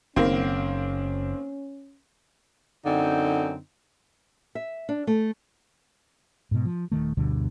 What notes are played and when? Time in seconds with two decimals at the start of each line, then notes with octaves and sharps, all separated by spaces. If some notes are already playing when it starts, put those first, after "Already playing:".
0.16 F#1 D#3 A#3 C4 C#4
2.85 F#2 D3 C4 D#4
4.55 E5
4.89 D4
5.07 A3
6.51 G#2 B2
6.65 F3
6.92 D#1 D#3 A3
7.17 D2 G2 B2 D3